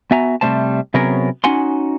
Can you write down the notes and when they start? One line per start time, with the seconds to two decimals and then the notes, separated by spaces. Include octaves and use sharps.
0.11 B3 F#4 E5 G#5 A#5
0.41 C3 F#3 G3 A3 C5 A5
0.94 C3 F#3 B3 C#4 G#4 A#4
1.44 C#4 D#4 F#4 F#5 G#5 C6